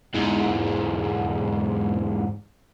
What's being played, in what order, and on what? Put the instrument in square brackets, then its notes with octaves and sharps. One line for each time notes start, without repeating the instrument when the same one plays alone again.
[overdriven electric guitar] E2 G#2